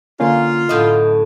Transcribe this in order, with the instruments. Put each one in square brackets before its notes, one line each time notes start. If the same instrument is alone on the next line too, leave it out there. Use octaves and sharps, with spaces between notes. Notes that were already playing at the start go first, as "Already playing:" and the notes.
[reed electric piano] D3 A#3 C#4 [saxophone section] F4
[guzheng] F#2 A2 D3 [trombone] A4 [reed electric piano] D#5 D#6 G6